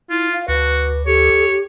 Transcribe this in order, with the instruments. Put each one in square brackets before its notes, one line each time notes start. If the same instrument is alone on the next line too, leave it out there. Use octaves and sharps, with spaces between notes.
[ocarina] E4 [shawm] F4
[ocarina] F5
[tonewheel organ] D2 [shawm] F#4 [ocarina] B4
[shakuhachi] G4 [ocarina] A4 [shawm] C#5